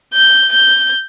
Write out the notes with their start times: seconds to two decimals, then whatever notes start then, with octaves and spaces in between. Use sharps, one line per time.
0.13 G6
0.53 G6